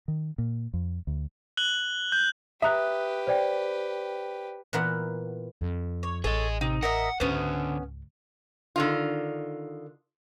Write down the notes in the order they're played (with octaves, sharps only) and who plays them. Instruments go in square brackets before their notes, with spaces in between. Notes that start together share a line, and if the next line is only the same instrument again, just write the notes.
[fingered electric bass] D#3
A#2
F2
D2
[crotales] F#6 F#7 G7
G6
[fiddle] G4 B4 [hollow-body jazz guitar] E5 A#5 [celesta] D#6 F#6
[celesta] C5 D5 G5
[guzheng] A#2 E3 B3 A#4 E5 F#5
[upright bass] F2
[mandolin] C#5
[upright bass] A1 [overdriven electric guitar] G#4 D#5 [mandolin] A4 C#5
[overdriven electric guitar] C3 [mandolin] D#4
[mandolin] A#4 D#5 E5 [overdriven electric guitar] F#5
[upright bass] C#2 G#2 [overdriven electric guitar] D3 C5 [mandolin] B3 C#4
[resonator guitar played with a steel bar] D3 D#3 F4